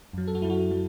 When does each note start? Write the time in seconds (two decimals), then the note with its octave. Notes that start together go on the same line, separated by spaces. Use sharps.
0.13 F#2 F#3
0.27 A4
0.35 F#4
0.42 F#2 F#3 E4
0.50 F#4
0.71 F#3